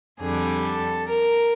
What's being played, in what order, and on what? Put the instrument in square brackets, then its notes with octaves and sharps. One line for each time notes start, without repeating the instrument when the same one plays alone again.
[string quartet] F2 D3 G3 G#4
A4
A#4